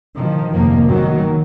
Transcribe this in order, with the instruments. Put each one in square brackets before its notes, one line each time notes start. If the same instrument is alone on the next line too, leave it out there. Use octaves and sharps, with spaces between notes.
[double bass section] D#3 F3
F1 G#2 D#3 F3 A#3
D#3 F#3